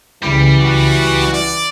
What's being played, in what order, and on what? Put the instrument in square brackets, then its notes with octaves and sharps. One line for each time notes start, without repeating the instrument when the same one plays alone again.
[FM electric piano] C#2 C#3 B5 [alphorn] E3 [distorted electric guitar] G3
[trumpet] F#4
D5